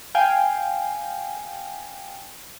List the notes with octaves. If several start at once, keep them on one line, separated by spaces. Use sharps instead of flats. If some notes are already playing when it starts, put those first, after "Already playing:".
F5 G5 G#5